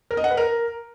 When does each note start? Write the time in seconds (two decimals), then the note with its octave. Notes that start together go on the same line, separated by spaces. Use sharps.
0.11 A#4
0.17 D#5
0.24 F#5
0.31 B4
0.37 A#4